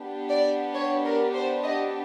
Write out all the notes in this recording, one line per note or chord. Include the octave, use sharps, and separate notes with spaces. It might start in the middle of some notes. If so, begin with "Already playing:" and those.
Already playing: B3 D4 G4
D5
C#5
A#4
C5
D#5